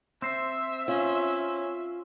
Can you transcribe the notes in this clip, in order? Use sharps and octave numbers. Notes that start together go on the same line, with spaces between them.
C4 C5 E5
C#4 F4